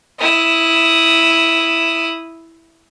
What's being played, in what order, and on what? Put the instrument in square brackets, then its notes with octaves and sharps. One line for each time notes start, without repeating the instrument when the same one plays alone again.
[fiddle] E4 D#6